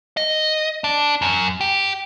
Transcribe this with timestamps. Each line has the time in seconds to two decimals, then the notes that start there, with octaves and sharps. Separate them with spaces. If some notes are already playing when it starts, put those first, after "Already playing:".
0.17 D#5
0.84 D4
1.22 F#2
1.61 G4